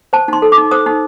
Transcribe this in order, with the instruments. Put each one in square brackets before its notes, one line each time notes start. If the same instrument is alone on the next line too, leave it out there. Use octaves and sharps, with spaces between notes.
[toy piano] C5 A5
D#4 C6
A4
D6
D#4
C5 D#6
D#4